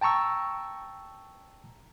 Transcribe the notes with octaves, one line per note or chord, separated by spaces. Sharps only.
G5 A5 A#5 C#6 E6